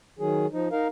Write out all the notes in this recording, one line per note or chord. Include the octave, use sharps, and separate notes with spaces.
D#3 F#3 G#4
F3 D#4
D#4 A#4 F5